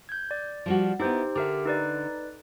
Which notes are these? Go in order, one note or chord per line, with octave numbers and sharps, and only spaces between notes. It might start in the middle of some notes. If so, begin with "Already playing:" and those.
G6 G#6
D5
F3 G3 F#4
B3 D#4 E4 G4 C5
D3 G4 A#4 E5
D#4 B4 D5